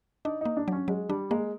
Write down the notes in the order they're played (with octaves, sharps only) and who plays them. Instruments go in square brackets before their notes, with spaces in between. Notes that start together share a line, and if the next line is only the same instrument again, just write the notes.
[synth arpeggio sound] D4 [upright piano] D#4
[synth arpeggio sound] A#3 [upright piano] D#4
[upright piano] D4
[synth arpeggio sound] F#3 [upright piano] C#4
[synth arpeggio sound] F#3 [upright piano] G#3
[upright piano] G3 [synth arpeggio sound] D4
[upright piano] G#3 [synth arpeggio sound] A#3